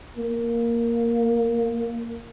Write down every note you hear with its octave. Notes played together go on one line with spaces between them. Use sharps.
A#3